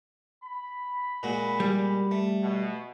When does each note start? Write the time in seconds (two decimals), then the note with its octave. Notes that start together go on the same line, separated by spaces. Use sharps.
0.44 B5
1.23 A#2 G#3 F#4
1.60 G3
2.11 A3
2.43 B2